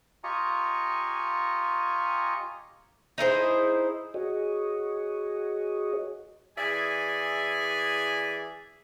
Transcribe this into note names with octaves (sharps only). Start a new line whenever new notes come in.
F4 G4 D#5 G#5 A#5 C#6
D#4 E4 G#4 C5
F#4 G#4 C#5 D#5
E3 G#4 D5 E5 G#5